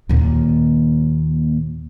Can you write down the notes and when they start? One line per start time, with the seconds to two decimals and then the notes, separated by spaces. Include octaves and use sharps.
0.09 D#2 A#2